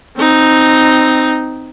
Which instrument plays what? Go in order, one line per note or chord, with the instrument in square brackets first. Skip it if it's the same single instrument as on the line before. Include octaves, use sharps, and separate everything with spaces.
[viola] C4 D#4